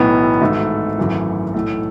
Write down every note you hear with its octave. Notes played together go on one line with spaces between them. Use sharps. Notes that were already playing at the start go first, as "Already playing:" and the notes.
Already playing: B1 A2 E3 B3
G#1 G#2 E3 A3
G#1 F#2 E3
B1 A2 E3 A3